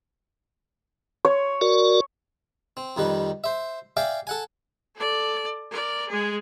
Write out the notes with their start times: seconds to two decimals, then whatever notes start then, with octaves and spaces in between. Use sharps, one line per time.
1.25 C#5
1.61 F#4 A#4 D5
2.77 C4
2.97 F2 D#3 G3 B4
3.44 C5 E5
3.97 D5 E5 F5 G5 G#5
4.27 A4 F#5 G#5
4.96 A4 D5
5.71 A#4 D5
6.09 G#3 G#4